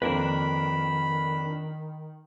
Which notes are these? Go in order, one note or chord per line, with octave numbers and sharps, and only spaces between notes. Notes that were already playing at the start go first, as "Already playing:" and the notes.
F2 D#3 A#3 D4 A#4 B4 B5